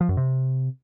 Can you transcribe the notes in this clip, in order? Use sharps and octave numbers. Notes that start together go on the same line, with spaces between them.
F3
F#2
C3